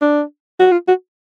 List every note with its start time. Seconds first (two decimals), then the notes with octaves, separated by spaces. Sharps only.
0.02 D4
0.60 F#4
0.72 F4
0.88 F#4